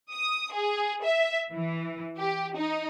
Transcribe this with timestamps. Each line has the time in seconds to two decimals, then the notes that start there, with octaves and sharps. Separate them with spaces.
0.12 D#6
0.54 G#4
1.04 E5
1.52 E3
2.19 G4
2.56 D#4